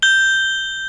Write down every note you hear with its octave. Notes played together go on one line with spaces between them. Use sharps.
G6 G7